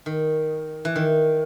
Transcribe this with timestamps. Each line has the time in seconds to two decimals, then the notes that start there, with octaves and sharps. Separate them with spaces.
0.06 D#3
0.85 E3
0.96 D#3